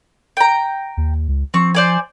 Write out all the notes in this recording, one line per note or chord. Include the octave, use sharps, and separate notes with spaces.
G5 A#5
D#2
C#2
F3 C4 C#6
C5 D5 G#5